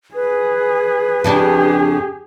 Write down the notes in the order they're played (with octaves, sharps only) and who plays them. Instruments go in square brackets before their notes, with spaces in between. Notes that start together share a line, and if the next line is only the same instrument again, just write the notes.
[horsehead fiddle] G#4 [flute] B4
[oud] F2 C#3 D4 [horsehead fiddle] G4 G#4